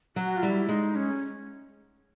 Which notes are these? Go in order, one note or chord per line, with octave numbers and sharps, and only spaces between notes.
F#3 F#4
F4
G3 E4
G#3 D#4
C#4